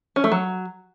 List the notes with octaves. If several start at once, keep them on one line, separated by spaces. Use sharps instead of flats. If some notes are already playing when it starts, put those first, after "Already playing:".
C#4
A3
F#3